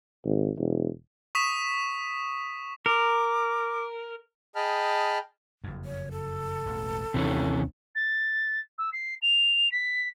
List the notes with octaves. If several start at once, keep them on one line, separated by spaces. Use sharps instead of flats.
G#1
E1
C#6 D#6 B6 E7
A#4 D6
G#4 D#5 G5 A5 B5 F6
F#1 F2
C#5
A4
E1 A1
A1 D#2 C3 E3 C#4 D4
A6
E6
C7
F7
B6